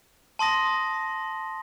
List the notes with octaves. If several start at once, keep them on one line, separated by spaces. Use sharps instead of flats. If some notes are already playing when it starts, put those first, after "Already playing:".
A5 C6 D#6 A#6